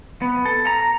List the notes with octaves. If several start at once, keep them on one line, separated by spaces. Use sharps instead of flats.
B3
A4
A#5